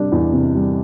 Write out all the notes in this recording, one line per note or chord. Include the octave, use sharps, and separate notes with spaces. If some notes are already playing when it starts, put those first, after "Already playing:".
Already playing: C3 G3 D4
E2
C3
G3